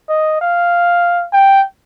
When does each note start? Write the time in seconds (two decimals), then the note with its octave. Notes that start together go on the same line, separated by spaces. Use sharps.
0.09 D#5
0.41 F5
1.33 G5